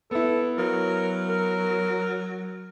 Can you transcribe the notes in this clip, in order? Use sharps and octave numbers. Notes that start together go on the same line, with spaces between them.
B3 E4 A4
F#3 A#4
A#4